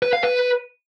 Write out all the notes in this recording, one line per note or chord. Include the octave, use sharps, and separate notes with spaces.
B4
F5
B4